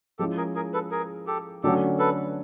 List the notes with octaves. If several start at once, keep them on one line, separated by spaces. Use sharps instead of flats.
F3 G#3 C#4 E4 G4 A4
G#4 A#4
G#4 A#4
A4 B4
G#4 A#4
G4 A4
D3 F#3 A3 C#4 F#4 G4 A4
A4 B4